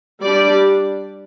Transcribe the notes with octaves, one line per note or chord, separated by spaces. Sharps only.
G3 D4 D5